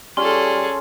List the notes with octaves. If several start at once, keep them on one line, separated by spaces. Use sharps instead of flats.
G3 C#4 F4 G#4 A4 C6 C#6